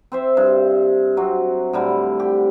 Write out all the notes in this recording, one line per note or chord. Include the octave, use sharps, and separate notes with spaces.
C4 C5 E5
G2
F#3 C4
A2 D3 G3
G4